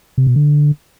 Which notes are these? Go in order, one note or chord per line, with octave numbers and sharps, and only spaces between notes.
C3
B2
D3